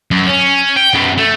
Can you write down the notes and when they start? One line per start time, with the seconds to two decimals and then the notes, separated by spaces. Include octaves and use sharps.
0.11 F#2
0.27 C#4
0.76 G5
0.94 F#2 B3
1.18 A3